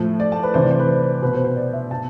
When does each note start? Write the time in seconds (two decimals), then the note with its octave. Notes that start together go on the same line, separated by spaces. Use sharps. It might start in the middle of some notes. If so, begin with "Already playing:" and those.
Already playing: A2 F3
0.20 D5
0.32 A5
0.43 B4
0.54 C3 E3 C5
0.62 D5
0.71 C5
0.79 B4
0.88 C5
1.22 B2 B4
1.33 C5
1.44 C5
1.56 D5
1.73 E5
1.91 B2 A5